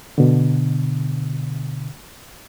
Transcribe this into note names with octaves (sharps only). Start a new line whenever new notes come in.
B2 D3